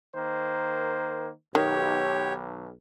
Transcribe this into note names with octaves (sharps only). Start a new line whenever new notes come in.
D#3 A#3 C5
B1 D#3 G4 C#5